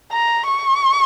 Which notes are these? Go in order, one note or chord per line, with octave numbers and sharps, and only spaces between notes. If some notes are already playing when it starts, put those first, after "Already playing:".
A#5
C#6